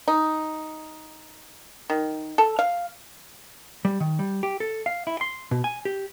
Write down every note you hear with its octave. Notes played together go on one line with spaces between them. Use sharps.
D#4
D#3
A4
F5
G3
D#3
G3
G4
A4
F5
E4
C6
B2
G#5
G4